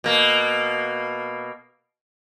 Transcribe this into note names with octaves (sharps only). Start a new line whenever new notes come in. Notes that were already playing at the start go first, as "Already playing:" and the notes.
B2 A#3